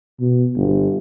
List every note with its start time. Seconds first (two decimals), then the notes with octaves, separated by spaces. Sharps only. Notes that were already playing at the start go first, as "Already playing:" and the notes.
0.20 B2
0.55 G1